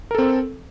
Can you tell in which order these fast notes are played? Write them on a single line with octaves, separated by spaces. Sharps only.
A#4 A4 C4